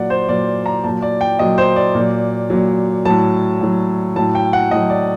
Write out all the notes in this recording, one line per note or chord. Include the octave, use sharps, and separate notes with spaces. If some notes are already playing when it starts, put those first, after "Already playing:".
Already playing: A#2 F#3 D5 F#5
C5
A#2 F#3 D5
A#5
A#2 F#3 A5
D5
G5
A#2 F#3 D#5
C5
D5
A#2 F#3
A#2 F#3
A2 F#3 A5
A2 F#3
A2 F#3 A5
G5
F#5
A2 F#3 D#5
D5